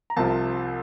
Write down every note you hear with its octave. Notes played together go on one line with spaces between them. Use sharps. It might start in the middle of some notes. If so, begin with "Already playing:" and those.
A#5
C2 C3 F3 A5